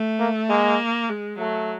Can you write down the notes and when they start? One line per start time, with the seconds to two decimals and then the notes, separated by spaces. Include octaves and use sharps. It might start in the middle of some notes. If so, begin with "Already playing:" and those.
Already playing: A3
0.19 A#3
0.50 G#3 A#3
1.09 G#3
1.39 F#3 A3